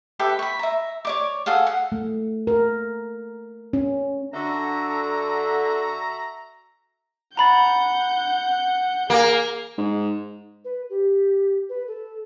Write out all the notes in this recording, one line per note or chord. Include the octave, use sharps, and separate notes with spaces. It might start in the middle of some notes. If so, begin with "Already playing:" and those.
G4 A4 B4 E5
B5 C#6
E5 A#5
C#5 D5 D6
G#4 A4 F5 F#5
F#5
A3
A#4
C#4
D3 F#4 A4 E5 A#5
F#5 A#5 B5 G6 A6
A#3 G#4
G#2
B4
G4
B4
A4